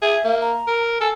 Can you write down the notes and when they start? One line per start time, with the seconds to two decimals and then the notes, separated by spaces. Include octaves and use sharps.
0.02 G#4 E5
0.24 A#3
0.41 A#5
0.67 A#4
1.00 A4 G#5